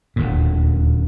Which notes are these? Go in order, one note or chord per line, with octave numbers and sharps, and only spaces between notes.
D#1 D2 A#2